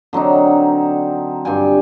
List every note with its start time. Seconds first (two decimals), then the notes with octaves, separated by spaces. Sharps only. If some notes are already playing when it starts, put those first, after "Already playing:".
0.13 D3 F#3 C4 D#4
1.45 G2 F4 G5 G#5